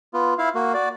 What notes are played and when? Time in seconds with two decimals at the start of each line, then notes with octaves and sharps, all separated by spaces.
0.14 B3 F4
0.38 E4 F5
0.55 A#3 F#4
0.74 F#4 D5